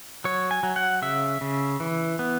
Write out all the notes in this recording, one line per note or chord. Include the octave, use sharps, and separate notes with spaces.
F#3 C#5
G#5
F#3
F#5
C#3 E5
C#3
E3
B3